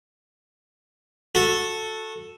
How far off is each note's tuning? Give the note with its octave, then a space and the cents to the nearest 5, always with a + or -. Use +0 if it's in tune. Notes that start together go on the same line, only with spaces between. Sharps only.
F#4 -20 A4 +0